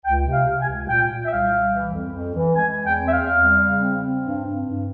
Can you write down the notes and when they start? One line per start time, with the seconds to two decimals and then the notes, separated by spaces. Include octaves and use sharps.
0.05 C#2 G5
0.26 C3
0.33 F5
0.47 C3
0.61 G#5
0.68 C#2
0.88 A#2 G5
1.09 A#2
1.25 E5
1.30 C2 F5
1.51 C2
1.72 E3
1.93 F2
2.14 F2
2.35 E3
2.56 G#3 G#5
2.77 E2
2.84 G5
2.98 C4
3.06 E5
3.11 F5
3.18 E2
3.39 G3
3.60 C#3
3.81 C4
4.02 C4
4.23 G2
4.44 G2
4.65 G2